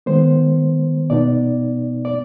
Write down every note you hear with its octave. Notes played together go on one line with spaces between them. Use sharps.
D#3 G#3 B3 C5
B2 B3 D#4 D5
D5